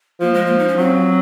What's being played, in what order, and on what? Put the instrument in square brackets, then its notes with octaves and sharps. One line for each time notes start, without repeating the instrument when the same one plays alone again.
[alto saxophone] F3 [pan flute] A#3
[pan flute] G#3
A#3
D#4
C#4
[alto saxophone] F#3 [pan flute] C4